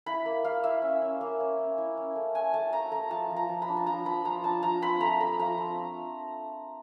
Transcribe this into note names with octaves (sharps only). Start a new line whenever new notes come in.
E4 B5
A#3
A#3 F5
E4 E5
C#4
C#4
A#3
C#4
C#4
E4
C#4
A3
A3 G#5
A3 A5
A3 A#5
A3 A#5
F3 A5
F3
A#5
F3
B5
D4
A5
F3 A#5
F3 B5
F3 A#5
D4 A5
F3 A#5
C4 B5
A3 A#5
A3 B5
F3 A#5
C4